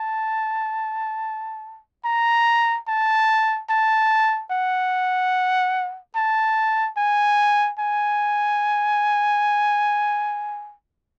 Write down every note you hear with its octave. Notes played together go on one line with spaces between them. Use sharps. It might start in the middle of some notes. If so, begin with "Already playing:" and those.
Already playing: A5
A#5
A5
A5
F#5
A5
G#5
G#5